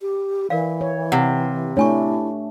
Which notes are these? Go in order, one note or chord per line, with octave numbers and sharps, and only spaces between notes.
G4
E3 A#4 D5 F5
C#5
C3 F5 F#5
A3 D4 E4 C#5 G#5 C#6